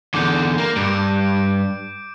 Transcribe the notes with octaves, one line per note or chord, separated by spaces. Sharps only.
E2 D3 D6 G6
A#3
G2 D7